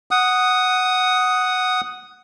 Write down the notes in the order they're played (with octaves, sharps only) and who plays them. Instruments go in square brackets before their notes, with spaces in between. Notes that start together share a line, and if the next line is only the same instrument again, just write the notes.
[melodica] F#5 D#6